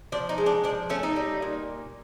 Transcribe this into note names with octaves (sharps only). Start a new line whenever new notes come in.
F3 D4
D#4
G#3
D4
F3 D4
A3 C#4
D#4
G3
A#2